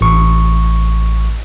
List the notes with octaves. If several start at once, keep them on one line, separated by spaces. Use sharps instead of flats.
A1 C#6